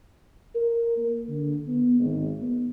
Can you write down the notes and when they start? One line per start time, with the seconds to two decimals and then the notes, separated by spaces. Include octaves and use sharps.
0.55 A#4
0.97 A#3
1.29 D3
1.66 B3
1.99 G#1
2.40 B3